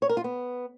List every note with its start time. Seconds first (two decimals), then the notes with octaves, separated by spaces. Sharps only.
0.02 C#5
0.09 A#4
0.17 F4
0.24 B3